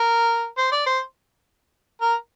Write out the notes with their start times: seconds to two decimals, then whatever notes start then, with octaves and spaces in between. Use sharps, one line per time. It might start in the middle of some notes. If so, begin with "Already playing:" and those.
Already playing: A#4
0.58 C5
0.72 D5
0.86 C5
2.01 A#4